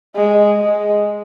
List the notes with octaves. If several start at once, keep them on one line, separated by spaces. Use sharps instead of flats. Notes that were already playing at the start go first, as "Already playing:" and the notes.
G#3
G#3